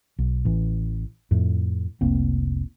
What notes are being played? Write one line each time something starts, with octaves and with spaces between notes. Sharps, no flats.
B1
A1 E3
F2 A2
F1 C2 A#3 C4